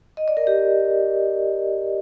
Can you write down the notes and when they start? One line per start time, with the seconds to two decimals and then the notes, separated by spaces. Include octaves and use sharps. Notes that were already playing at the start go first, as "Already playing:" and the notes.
0.17 D#5
0.28 D5
0.37 A#4
0.47 G4